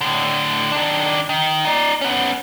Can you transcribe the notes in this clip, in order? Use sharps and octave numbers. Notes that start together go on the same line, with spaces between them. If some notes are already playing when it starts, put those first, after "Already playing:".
A2 D3
D#3 D4
D#3
D#4 D5
B3 C#4